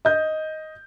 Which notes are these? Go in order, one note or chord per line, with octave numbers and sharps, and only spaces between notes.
D#5 G6